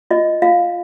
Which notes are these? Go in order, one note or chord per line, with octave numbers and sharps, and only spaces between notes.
F4 D#5
F4 F5